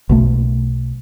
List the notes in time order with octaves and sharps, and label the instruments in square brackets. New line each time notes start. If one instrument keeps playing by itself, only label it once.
[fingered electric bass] B1 B2 A3